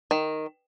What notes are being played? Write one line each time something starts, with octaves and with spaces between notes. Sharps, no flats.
D#3